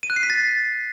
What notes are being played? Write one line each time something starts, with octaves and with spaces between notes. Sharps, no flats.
D#7
F#6
C7
B6
A6